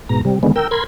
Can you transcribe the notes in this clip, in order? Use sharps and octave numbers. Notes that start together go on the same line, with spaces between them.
G#2 B2 A#5
C3 G3
D3 D#3 G#3 B3
A#4 G5 E6
A#4 B5 C6 G#6